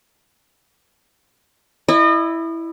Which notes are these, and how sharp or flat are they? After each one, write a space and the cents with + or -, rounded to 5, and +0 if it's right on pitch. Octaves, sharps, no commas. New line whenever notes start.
E4 +0 D#5 -35